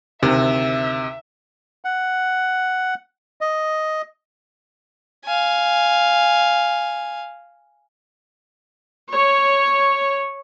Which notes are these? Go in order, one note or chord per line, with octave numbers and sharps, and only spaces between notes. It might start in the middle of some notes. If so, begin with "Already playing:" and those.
D2 C3 D#3 E5
F#5
D#5
F5 G#5
C#5